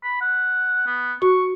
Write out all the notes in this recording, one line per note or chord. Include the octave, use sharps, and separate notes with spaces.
B5
F#5
B3
F#4 C#6